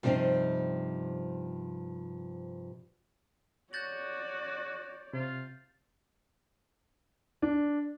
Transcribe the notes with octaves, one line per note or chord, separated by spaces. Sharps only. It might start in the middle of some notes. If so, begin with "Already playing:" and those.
G2 C3 F3 A3 C4 D#4
F#4 C#5 D5 G6 A6 F#7
C3 F4
D4